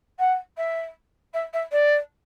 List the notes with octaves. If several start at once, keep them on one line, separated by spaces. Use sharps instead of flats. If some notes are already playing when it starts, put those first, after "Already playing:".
F#5
E5
E5
E5
D5